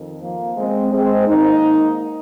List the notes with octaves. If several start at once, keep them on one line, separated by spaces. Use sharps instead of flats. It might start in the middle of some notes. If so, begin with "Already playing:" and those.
Already playing: F2 D#3
F3 A#3
G#3 C4
G#3 C4
G#2 D#3 A#3 D#4